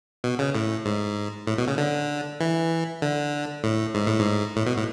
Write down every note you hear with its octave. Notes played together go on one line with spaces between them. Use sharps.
B2
C#3
A2
G#2
A2
B2
C#3
D3
E3
D3
A2
G#2
A2
G#2
A2
B2
A2